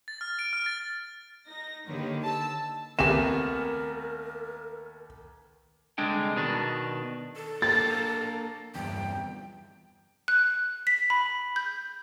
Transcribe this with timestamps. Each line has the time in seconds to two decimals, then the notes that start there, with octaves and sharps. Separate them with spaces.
0.08 A6
0.21 F6
0.39 D7
0.53 F6
0.66 A6
1.46 D#4 A#6
1.87 D3 D#3 A#3 G4 B4 C#5
2.25 A5 E6
2.99 D#2 A3 B3 C4 G4 A#4 G#5 E7
5.98 C2 D3 G#3 D4 G5
6.36 B2 D#3 D4
7.36 A4
7.62 A#3 D4 A6
8.75 E2 G2 G5
10.28 F#6
10.87 B6
11.10 B5
11.56 G6